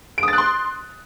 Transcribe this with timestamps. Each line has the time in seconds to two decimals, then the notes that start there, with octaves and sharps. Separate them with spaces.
0.18 D7
0.23 D#6
0.28 A6
0.33 F#6
0.38 C6